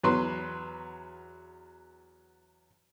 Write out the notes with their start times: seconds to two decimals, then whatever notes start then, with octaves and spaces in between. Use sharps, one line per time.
0.04 E2 F#3 B4 C6